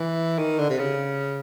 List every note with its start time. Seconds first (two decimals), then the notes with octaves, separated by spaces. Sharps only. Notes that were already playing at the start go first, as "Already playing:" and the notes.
Already playing: E3
0.39 D#3
0.59 D3
0.70 C3
0.79 C#3